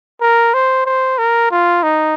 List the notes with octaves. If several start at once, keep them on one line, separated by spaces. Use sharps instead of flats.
A#4
C5
C5
A#4
F4
D#4